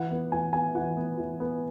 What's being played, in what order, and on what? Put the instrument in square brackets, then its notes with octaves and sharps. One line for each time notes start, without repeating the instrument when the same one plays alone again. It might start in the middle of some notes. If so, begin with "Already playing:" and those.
Already playing: [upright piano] E3 F#5
B3
E3 G#5
B3 G#5
E3 F#5
B3
E3
B3